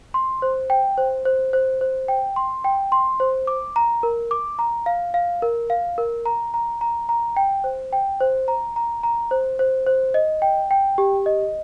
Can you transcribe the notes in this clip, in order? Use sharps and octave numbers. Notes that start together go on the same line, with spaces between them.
C6
C5
G5
C5
C5
C5
C5
G5
C6
G5
C6
C5
D6
A#5
A#4
D6
A#5
F5
F5
A#4
F5
A#4
A#5
A#5
A#5
A#5
G5
C5
G5
C5
A#5
A#5
A#5
C5
C5
C5
D#5
G5
G5
G4
D#5